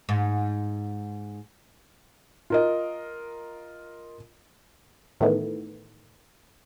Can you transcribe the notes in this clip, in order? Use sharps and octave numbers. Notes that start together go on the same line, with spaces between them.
G#2
F4 A#4 D#5
A2 D#3 E3 A3 B3